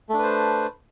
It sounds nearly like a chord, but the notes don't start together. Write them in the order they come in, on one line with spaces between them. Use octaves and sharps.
A3 D4 B4 C5